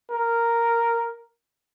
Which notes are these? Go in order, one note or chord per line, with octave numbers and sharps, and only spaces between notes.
A#4